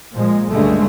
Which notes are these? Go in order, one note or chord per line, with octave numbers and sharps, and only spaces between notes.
A#2 F3 G#3
C#2 G2 D3 G#3 A3